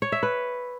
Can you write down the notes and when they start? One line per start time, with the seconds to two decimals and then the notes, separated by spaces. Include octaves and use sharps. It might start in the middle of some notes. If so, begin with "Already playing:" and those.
0.02 C#5
0.12 E5
0.23 B4